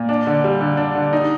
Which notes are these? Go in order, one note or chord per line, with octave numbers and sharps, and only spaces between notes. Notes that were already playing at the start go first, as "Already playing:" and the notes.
Already playing: A#2
D4
D3
G3
D3
D4
D3
D#4